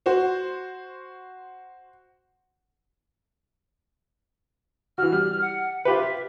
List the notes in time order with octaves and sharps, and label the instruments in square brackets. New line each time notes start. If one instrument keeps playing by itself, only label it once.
[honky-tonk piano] F#4 C5
[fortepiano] E3 F#4 [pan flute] F6
[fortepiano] G3
[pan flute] F#5
[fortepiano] F4 G4 B4 [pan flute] E5